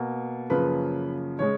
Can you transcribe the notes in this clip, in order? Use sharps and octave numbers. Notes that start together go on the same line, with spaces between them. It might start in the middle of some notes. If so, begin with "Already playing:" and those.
Already playing: B2 A#3
F#2 C#3 F3 A#3 B4
C#3 G#3 C#5